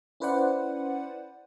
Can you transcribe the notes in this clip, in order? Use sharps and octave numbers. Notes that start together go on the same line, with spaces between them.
C#4 E4 B4 C5 D5 F#5